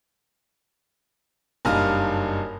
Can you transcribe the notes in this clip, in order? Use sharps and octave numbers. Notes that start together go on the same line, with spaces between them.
F#1 G2 D#4 D#5 F5 F6